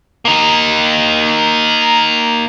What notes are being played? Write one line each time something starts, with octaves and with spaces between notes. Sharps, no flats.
A#3 D#4